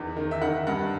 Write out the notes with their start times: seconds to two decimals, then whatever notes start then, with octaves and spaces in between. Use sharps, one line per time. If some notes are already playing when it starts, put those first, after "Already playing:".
Already playing: E2 D#3
0.17 D#3
0.31 E5
0.42 D#3 F#5
0.67 G2 F#5